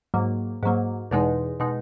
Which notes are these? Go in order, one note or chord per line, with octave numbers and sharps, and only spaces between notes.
G#2 F#3 A#3
G#2 F#3 A#3
E2 B2 G#3 D#4
B2 G#3 D#4